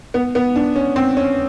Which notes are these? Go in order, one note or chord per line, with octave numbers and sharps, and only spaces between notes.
B3
B3
D4
C#4
C4
C#4